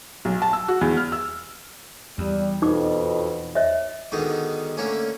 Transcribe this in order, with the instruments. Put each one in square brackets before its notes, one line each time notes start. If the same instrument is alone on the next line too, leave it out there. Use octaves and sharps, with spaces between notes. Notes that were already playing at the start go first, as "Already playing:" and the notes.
[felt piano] B1
A5
E6
F#4
E2
F6
E6
[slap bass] E2 [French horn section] G3
[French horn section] F2 B2 [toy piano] D#4 D6
[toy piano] C#5 D#5 E5
[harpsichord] G#2 B2 D3 D#3 D#4
D3 A3 A#3 C#4